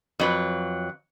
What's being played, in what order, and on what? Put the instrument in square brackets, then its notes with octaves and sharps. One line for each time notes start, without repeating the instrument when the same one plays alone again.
[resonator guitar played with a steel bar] F2 F#3 B4